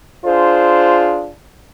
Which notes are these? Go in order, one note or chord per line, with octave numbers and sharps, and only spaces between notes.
D4 F4 G#4 C5